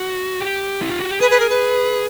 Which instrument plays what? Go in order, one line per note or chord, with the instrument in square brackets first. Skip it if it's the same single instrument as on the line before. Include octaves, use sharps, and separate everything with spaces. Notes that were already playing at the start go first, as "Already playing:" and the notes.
Already playing: [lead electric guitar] F#4
G4
E4
F4
F#4
G4
[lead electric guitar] G#4 [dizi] B4
[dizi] B4
A#4
B4